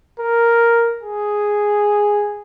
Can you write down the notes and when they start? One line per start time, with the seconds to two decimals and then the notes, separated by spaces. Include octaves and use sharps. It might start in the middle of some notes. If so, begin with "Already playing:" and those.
0.20 A#4
1.03 G#4